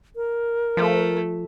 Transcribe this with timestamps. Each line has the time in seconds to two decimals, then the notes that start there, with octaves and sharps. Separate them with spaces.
0.16 A#4
0.77 F3 A3